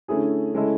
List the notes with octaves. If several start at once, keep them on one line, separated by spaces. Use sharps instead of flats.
D3 A3 C#4 E4 G#4
C#3 G#3 C#4 E4 A4